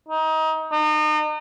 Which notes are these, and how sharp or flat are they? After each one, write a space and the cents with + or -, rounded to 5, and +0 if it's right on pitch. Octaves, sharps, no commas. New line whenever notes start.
D#4 +25
D#4 -35